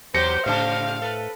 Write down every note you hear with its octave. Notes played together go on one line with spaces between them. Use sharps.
E2 C3 F#3 G4 C5 A#6 C#7
A2 C#3 C4 G4 C5 F5 A5
A4 B4